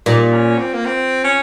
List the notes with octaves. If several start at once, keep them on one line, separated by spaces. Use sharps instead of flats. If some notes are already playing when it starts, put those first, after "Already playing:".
A#2 D#4
C#4
C4
A#3
C4
C#4